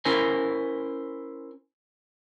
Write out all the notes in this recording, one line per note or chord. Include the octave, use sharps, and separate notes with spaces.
C#4 E4 A#4 C5 G#5